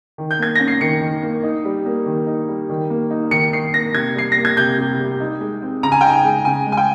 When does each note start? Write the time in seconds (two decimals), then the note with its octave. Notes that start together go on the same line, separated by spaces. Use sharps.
0.18 D#3
0.31 G6
0.39 A#3 G#6
0.55 C#4 A#6
0.68 C7
0.81 D#3 C#7
1.01 D#3
1.23 A#3
1.43 D#4
1.65 G3
1.86 A#3
2.06 D#3
2.27 D#4
2.48 G3
2.70 D#3
2.90 A#3
3.10 D#4
3.31 D#3 C#7
3.53 D#3 C7
3.74 A#3 A#6
3.94 C3 G#6
4.15 G3 C7
4.32 A#3 A#6
4.45 G#6
4.57 C3 G6
4.78 C3
5.00 G3
5.20 D#4
5.41 G#3
5.62 C4
5.83 C#3 A#5
5.92 G#5
6.01 D#4 G5
6.10 G#5
6.24 G#3
6.45 C#3 G#5
6.67 G#3
6.72 G#5
6.77 G5